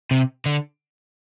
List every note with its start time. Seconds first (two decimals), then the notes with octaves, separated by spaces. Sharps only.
0.11 C3
0.46 D3